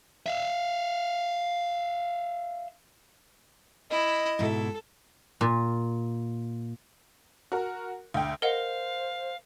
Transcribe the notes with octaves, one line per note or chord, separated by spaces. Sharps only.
E5 F5
E4 D#5
G#2 B2 E4 A4
A#2
F#4 A#4
D2 G5
A#4 C5 D#5 F5 F#5